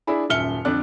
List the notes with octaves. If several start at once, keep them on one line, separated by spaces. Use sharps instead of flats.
D4 E4 G#4 B5
D#1 F#2 E5 F6 C#7 G7
F2 D3 D4 D5 F#6